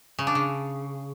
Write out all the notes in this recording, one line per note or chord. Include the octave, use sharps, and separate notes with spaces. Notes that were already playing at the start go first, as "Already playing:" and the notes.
C#3
D4
C#3